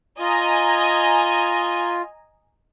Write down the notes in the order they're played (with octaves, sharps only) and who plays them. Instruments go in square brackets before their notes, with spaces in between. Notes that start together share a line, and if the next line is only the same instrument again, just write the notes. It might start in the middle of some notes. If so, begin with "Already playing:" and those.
[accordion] F4 [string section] D#5 G#5 A#5